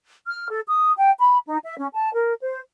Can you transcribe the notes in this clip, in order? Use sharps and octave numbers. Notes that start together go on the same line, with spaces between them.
F6
A4
D#6
G5
B5
D#4
E5
C#4
A5
A#4
C5